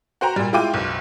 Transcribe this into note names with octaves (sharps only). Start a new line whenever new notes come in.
F#4 C5 G5 A#5
A#2 G3
G#3 E4 F4 G5 D6 D#7
F#1 B1